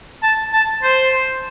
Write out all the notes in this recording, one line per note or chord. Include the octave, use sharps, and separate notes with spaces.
A5
A5
C5